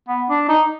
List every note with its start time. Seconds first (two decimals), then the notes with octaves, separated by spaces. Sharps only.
0.09 B3
0.30 D4
0.49 D#4